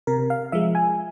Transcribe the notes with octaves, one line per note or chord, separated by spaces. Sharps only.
C3 A#4
F5
F3 G#3 E5
G#5